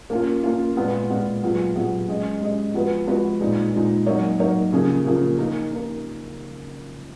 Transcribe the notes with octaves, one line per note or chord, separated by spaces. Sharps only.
A#3 C#4 F4
A#3 C#4 F4
A#2 G#3 B3 F4
A#2 G#3 B3 F4
A#2 F#3 B3 F4 G#4
A#2 F#3 B3 F4 G#4
G#3 C#4 G#4 D#5
G#3 C#4 G#4 D#5
F3 G#3 B3 F#4 B4
F3 G#3 B3 F#4 B4
A#2 G#3 D#4
A#2 G#3 D#4
F#3 A#3 D#4 A#4 C#5
F#3 A#3 D#4 A#4 C#5
C#3 F3 A#3 C#4 G#4
C#3 F3 A#3 C#4 G#4
A#3 D#4 A#4
A#3 D#4 A#4